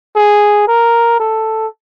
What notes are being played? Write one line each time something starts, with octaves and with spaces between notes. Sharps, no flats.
G#4
A#4
A4